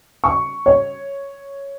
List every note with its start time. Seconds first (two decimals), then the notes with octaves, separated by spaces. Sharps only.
0.24 C#6
0.66 C#5